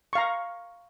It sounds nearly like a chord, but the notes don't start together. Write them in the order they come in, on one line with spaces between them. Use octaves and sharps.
C#6 F5 A#5